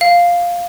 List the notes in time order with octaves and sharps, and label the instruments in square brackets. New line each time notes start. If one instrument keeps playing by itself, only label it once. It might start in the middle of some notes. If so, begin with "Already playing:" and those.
[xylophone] F5